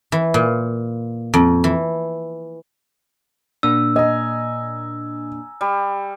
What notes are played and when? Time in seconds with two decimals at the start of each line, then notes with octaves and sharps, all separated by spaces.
0.12 E3
0.34 A#2
1.34 F2
1.64 E3
3.63 A#2 A#3 D4 E6
3.96 D#5 G#5 A#5
5.61 G3